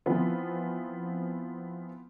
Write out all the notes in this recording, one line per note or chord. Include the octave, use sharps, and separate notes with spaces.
E3 F3 B3 C4 F4